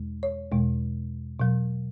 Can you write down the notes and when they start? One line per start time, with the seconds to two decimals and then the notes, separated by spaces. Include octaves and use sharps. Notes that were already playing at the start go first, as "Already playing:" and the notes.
Already playing: E2 B2 G#3
0.23 C#5
0.52 E2 B2 G#3
1.40 B2 F#3